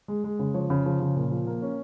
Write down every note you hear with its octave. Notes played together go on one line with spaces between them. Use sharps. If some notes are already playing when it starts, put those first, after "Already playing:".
G#3
G#3
C#3
F3 C#5
C#3
F3
C#3
A#2
F3
A#3
C#4